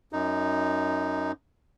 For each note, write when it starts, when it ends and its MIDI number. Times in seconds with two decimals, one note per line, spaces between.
0.13 1.32 42
0.13 1.32 63